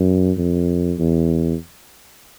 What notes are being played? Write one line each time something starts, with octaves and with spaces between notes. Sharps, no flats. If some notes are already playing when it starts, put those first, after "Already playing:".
Already playing: F#2
F2
E2